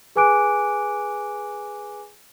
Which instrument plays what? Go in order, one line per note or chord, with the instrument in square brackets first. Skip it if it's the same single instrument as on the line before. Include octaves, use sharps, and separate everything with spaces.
[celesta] G#4 B4 G#5 D6 F#6 D7